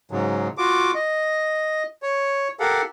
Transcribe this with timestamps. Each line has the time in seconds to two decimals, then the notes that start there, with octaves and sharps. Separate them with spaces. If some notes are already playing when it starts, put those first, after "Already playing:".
0.11 G#2 C#3 F#3
0.58 F4 F#4 D6
0.95 D#5
2.03 C#5
2.60 G4 A4 A#4 F5 F#5